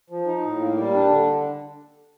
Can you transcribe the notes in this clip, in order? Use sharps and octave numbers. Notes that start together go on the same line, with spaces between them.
F3
D#4
A2
A#3
G3
D4
D3